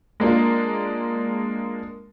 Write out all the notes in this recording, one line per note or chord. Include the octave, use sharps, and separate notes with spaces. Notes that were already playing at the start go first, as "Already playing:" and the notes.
G#3 A#3 D4 F4